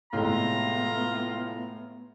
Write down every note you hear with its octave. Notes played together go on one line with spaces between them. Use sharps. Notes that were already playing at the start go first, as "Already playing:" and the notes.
A2 C3 G#3 A3 B3 F4 A#5